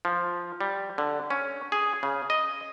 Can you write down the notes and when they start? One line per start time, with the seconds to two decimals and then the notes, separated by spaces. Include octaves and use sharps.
0.05 F3
0.61 G3
0.98 D3
1.30 C#4
1.72 G#4
2.03 C#3
2.30 D#5